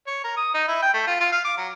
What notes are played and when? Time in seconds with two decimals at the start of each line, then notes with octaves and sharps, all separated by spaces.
0.07 C#5
0.24 A#4
0.37 D#6
0.54 D#4
0.68 E4
0.82 G5
0.94 A3
1.07 F4
1.20 F4
1.32 F5
1.45 D6
1.58 F#3